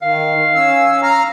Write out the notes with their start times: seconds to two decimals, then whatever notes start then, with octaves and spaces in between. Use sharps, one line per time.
0.02 D#3 F5
0.55 C#4 E6
1.03 F5 A#5 F6